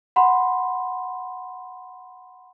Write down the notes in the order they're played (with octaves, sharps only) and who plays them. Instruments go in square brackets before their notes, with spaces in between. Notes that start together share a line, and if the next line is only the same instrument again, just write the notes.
[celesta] F#5 B5 C6